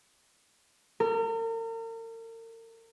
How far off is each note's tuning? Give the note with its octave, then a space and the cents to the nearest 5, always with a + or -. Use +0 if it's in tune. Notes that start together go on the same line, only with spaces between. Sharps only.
A#4 -40